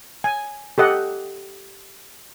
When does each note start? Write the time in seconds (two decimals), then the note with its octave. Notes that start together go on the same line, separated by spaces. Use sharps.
0.24 G#5
0.78 G4 A4 D#5 F#5